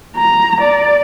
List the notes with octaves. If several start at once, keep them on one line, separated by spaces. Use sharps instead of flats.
A#5
D5